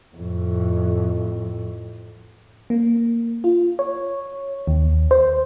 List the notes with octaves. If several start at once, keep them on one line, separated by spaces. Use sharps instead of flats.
F2 A2
A#3
F4
C#5
D#2
C5